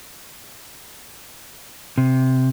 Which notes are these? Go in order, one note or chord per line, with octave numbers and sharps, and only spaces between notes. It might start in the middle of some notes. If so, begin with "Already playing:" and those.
C3